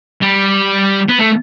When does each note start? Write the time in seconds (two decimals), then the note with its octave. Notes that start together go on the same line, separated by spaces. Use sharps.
0.22 G3
1.08 B3
1.19 A3